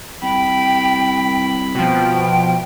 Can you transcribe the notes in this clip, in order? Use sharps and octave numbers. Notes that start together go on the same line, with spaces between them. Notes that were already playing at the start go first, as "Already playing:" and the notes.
C2 G5 B5
B2 F3 G5